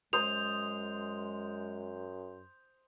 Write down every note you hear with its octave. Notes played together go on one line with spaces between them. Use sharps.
F#2 G#3 C5 D#6 F7